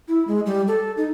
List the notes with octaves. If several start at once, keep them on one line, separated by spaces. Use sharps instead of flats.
E4
G#3
G3
A4
D#4